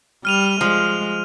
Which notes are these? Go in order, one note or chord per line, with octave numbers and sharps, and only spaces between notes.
G3 F6 D#7 F7
F3 G#3